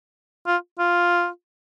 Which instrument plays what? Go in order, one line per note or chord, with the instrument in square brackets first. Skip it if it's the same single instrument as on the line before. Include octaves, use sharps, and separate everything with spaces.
[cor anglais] F4
F4